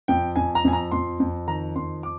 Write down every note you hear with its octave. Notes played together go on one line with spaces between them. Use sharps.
F2 G5
F2 G#5
A#5
F2 G#5
A#5
F2 C6
F2
D#3 A#5
F2 C6
D6